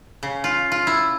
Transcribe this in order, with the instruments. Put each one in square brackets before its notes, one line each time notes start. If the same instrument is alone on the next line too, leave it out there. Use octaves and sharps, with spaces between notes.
[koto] C#3
F4
F4
E4